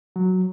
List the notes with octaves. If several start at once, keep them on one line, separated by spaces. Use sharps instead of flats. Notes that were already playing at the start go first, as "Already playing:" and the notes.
F#3